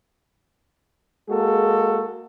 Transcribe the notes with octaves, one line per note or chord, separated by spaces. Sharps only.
G#3 A#3 F#4 G#4 A4